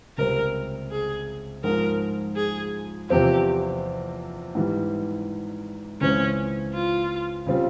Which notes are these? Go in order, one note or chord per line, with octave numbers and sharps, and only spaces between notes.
C#2 C3 G3 C4 A#4
G#4
G#2 F3 G#3 A#4
G#4
E2 C3 F3 C4 F4 G4
G#2 E3 G3
C#2 C#3 E3 G#3 C4 C#4
F4
C#3 G3 C4 F4